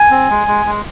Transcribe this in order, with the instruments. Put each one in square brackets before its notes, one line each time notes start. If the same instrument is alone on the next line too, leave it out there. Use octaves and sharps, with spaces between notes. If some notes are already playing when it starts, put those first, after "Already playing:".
Already playing: [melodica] G#5
C4
G#3
G#3
G#3